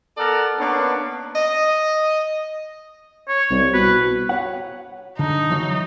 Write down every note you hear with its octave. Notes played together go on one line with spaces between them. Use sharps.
B3 A4 A#4 D5 F#5 A#5
A#3 B3 C#4 D4
D#5
C#5
C2
B2 B4
C#5 F#5
D3 D#4
E3 F#3